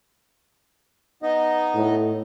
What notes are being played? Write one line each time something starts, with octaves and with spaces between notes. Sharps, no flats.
B3 D#4 D#5
A2